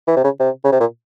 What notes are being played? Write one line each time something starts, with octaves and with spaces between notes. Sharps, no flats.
E3
C3
C#3
C3
C#3
C3
A#2